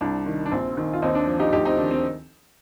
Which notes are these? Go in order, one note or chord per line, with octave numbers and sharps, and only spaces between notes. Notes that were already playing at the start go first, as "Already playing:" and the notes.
C2 D4
D#3
D4
A#1 C4
D#3
F4
D#2 C4 D#4
D4
F3
D#4 G4
D2 D#4 G4
C4 D#4
D#3 D4
C4